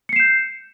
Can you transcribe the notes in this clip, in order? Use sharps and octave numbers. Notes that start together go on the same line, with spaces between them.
G6 C7 C#7 E7